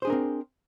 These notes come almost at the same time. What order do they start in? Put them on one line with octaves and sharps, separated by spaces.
C5 G#4 D4 A#4 C4